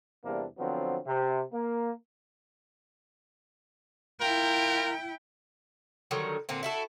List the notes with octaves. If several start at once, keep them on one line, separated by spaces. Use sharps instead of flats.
E2 C3 G3 A#3 D4
D3 F3 F#3 B3 C4
C3
A#3
E4 F4 A#4 G5
D3 D#3 F#3 G3
A#2 D3 C4
E4 F#4 A4